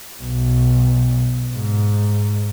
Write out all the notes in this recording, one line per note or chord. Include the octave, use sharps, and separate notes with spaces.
B1
G#2